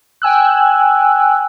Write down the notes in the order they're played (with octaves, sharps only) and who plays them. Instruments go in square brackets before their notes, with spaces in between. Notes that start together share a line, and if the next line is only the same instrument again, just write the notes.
[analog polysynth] G5 G#5 E6 F#6